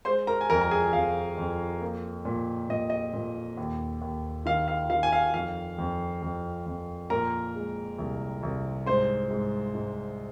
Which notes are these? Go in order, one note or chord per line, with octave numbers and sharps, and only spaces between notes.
G#3 C5 C6
A#4 A#5
G#5
F2 A#4 A#5
A#5
G#4 G#5
F2 F5
F2
A#3
A#2
A#2 D#5
D#5
A#2
D#2
D#2
D#3 F5
F5
D#3 F5
G#5
F5
F2 F5
F2
F2
F2
A#2 A#4 A#5
G#3
C2
C2
G#2 C5 C6
G#2
G#2